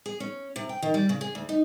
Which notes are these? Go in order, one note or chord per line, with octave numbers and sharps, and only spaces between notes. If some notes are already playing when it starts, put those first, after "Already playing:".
G#4
C#4
C3
G5
D#3
G3
C#3
G#4
D2
D#4